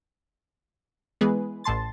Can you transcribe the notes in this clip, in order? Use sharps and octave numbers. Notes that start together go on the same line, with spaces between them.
E3 G#3 B3 G#4 B4
A1 A2 A5 C6 A6